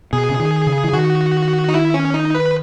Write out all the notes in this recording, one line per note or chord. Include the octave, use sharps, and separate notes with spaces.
B2 G#4
C#3
D#3
C#3
E3
D#3 F#4
D#4
E4
C#4
D#4
B4